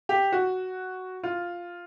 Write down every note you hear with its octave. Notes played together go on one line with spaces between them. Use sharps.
G4
F#4
F4